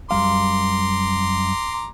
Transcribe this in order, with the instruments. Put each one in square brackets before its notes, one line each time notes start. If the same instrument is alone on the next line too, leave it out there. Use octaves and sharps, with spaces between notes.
[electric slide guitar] F#2 G3 F5 [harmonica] A#5 C6 D6